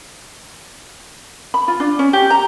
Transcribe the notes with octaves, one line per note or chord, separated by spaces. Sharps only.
B5
F4
D4
C#4
G4
A#5